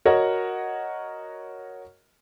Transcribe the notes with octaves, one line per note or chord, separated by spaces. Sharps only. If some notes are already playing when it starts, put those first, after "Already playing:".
F#4 A#4 C#5 D#5 F#5